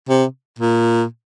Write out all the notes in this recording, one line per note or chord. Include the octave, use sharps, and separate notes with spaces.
C3
A#2